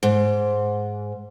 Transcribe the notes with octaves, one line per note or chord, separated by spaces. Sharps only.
G#2